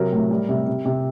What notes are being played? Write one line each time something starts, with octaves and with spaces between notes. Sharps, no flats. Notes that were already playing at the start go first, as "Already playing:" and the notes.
Already playing: C3 F#3 A#4
A2
G3
C3
C3
C3